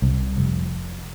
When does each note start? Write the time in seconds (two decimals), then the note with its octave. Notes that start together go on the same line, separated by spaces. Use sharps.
0.02 C2
0.38 F1